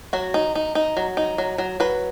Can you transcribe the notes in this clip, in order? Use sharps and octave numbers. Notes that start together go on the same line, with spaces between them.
F#3 F#4
D#4
D#4
D#4
F#3
D#4
F#3
F#3
F#3 B4